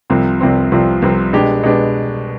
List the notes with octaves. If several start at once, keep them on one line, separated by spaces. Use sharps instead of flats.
C2 C3 F3 C4
C2 C3 F3 C4
C2 C3 F3 C4
C2 C3 F3 C4
B2 G#3 D4 G4
B2 G#3 D4 G4